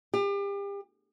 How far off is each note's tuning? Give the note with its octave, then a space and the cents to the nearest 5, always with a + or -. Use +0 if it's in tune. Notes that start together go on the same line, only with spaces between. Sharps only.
G4 +35